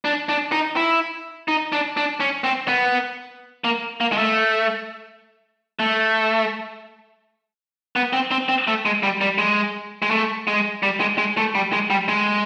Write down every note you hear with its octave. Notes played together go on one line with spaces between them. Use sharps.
D4
D4
D#4
E4
D#4
D4
D4
C#4
C4
B3
A#3
A#3
G#3
A3
A3
B3
C4
C4
C4
A3
G#3
G3
G3
G#3
G#3
A3
G#3
G3
G#3
G#3
A3
G3
G#3
G3
G#3